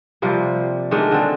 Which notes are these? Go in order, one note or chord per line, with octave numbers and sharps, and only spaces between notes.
C3 F3 G3 A#3
D#3 G#3 A3 D4
D3 C4